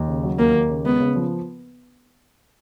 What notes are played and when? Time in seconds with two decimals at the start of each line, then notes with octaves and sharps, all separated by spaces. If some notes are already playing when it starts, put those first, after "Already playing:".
Already playing: D#2
0.08 C#3
0.23 F#3
0.38 D#2 A#3
0.54 D#2
0.69 C#3
0.85 G#3 B3
1.00 C#3
1.16 F3